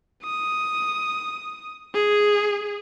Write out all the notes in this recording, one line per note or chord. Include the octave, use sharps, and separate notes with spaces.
D#6
G#4